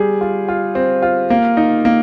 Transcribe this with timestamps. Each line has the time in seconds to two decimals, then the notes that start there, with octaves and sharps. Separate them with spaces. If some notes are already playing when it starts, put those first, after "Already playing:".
Already playing: G3 G#4
0.21 F4
0.49 F4
0.75 C4
1.02 F4
1.30 A#3
1.57 D#4
1.85 A#3